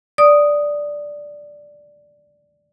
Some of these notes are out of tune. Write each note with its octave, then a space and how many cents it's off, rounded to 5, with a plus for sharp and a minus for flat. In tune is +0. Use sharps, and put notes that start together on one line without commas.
D5 +0 D#6 -5